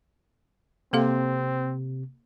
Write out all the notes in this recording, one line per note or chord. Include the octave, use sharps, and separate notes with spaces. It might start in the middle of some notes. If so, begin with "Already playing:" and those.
C3 A#3 C4 A4 F5